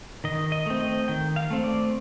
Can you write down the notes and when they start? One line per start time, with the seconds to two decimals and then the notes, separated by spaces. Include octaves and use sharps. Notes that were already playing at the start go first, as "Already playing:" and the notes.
0.24 D#3 D#5
0.52 D#5
0.66 A3 C4
0.80 D#5
1.08 D#3 G5
1.36 F5
1.50 A3 C4
1.64 D5